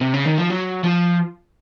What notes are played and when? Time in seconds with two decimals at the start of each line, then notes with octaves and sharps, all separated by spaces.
0.01 C3
0.14 C#3
0.25 D#3
0.38 F3
0.50 F#3
0.83 F3